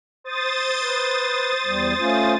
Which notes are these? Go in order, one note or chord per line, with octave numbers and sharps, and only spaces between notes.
C5 D#6 A6
B4
E2 G3
A3 C#4 F4